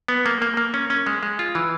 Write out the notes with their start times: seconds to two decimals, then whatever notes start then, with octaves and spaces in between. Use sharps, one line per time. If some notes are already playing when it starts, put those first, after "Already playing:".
0.08 B3
0.26 A#3
0.42 A#3
0.57 A#3
0.74 C#4
0.90 C#4
1.06 G#3
1.23 G#3
1.39 F4
1.55 E3